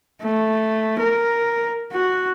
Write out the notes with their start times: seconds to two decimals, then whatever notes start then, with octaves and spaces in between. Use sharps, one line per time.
0.22 A3
1.00 A#4
1.93 F#4